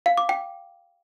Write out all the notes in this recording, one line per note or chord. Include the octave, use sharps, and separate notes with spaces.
F5
D6
G5